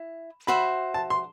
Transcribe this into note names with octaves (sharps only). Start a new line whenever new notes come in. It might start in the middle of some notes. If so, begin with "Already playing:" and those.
Already playing: E4
F#4 C5 E5 B5
A5
C6